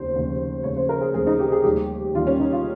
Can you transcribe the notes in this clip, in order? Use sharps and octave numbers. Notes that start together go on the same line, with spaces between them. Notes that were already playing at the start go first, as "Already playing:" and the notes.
Already playing: F1 D#2 C#3 C5
F1 D#2 C#3
F1 D#2 C#3 C#5
C5
A#4
G#4
F1 D#2 C#3 G#4
D#4
G4
G#4
D#2 D#3 G3 G4
D#2 D#3 G3 F4
C#4
D#4
F4